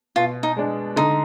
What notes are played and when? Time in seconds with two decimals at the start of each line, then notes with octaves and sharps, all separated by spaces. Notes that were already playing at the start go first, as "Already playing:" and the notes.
0.16 B2 F4
0.43 D#4
0.57 G#3 D4
0.96 D3 D#4